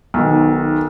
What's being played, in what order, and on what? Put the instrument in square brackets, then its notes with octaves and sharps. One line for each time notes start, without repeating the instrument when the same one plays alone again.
[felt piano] B1 D#3